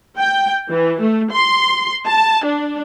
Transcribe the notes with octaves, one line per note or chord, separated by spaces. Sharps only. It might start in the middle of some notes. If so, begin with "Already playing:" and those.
G5
E3
A3
C6
A5
D4